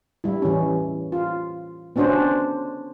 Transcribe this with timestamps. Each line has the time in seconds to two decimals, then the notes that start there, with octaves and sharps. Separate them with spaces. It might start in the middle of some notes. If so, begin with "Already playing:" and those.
0.24 G3 E4
0.42 E3 C#4
1.12 F4
1.96 B3 C#4 D4 F#4 C5